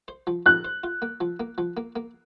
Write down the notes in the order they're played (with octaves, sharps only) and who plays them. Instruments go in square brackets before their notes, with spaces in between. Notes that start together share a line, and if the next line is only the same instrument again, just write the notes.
[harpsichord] C5
F3
[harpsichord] F3 [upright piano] F#6
[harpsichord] C5
F4
A#3
F3
A#3
F3
A#3
A#3